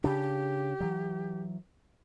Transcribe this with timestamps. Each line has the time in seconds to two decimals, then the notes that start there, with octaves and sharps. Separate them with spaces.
0.04 C#3 D4 G4
0.80 E3 F#3